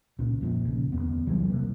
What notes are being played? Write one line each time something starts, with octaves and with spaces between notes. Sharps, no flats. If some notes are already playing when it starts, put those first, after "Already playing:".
C#2 A#2 C#4
F2 A#2 F3
A#1 C#3
D1 G#1 E2 B3
C2 E3 F#3 G3
C3 E3 G3 A#3